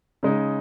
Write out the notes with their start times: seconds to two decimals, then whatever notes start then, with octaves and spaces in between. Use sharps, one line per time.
0.23 C#3 G#3 D#4